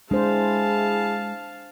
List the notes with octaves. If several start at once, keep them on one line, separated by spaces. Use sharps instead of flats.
G#3 D4 E4 G#4 C5 F5 A5